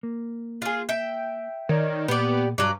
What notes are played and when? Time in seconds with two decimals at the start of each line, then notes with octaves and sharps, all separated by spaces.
0.03 A#3
0.62 F4 G#4
0.89 E5 G5
1.69 D#3 A#4 C#5 D5
2.08 A#2 B3 G4 D5
2.58 G2 F#3 D5